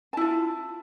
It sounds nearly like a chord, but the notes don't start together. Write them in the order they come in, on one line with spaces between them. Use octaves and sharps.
A5 E4 F4